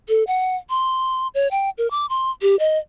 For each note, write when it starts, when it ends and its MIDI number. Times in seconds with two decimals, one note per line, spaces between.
0.09 0.24 69
0.27 0.56 78
0.70 1.28 84
1.34 1.48 73
1.51 1.70 79
1.78 1.90 70
1.91 2.06 86
2.09 2.31 84
2.42 2.56 67
2.59 2.78 75